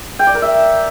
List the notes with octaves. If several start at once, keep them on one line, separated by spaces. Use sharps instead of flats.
G5
D5
A#4
E5